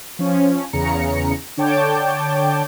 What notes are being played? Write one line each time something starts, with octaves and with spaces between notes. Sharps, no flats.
F3 C#4
E2 C#3 A#5 C#7
D3 C#5 G5 A5 D6 G6